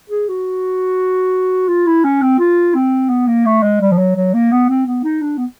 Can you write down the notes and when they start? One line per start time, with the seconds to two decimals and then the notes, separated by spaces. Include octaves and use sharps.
0.10 G#4
0.28 F#4
1.68 F4
1.87 E4
2.04 C#4
2.22 C4
2.39 F4
2.75 C4
3.09 B3
3.27 A#3
3.46 A3
3.63 G#3
3.81 G3
3.92 F3
3.98 F#3
4.16 F#3
4.34 A#3
4.52 B3
4.69 C4
4.87 B3
5.04 D#4
5.22 D4
5.38 B3